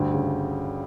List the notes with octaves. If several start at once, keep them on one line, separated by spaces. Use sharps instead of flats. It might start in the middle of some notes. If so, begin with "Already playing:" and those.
Already playing: D2 G2 G5
C#3